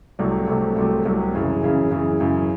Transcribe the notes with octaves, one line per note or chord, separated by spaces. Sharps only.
C2 C3 F#3 A3
C2 C3 F#3 A3
C2 C3 F#3 A3
C2 C3 F#3 A3
F#2 C#3 E3
F#2 C#3 E3
F#2 C#3 E3
F#2 C#3 E3